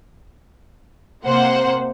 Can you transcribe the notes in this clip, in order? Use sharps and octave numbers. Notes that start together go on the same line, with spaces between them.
C3 A#3 C5 F#5